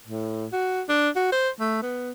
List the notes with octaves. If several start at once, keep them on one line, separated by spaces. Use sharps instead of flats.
A2
F#4
D4
F#4
C5
A3
B3